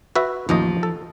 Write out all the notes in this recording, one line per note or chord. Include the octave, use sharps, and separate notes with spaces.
F#4 B4 E5
A1 D#2 F3 D#5
A4